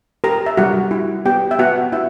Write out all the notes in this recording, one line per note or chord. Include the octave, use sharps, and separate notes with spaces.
G4 A#4 A#5
E5
G3 F#4 F#5
E4
B3 G4 G5
E5
B3 F#4 F#5
B3 E4 E5